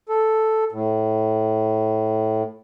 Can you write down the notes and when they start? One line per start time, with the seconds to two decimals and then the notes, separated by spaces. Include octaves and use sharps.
0.09 A4
0.72 A2